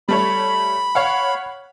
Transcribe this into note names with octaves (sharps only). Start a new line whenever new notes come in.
G3 A3 C#5 B5
C#5 F5 F#5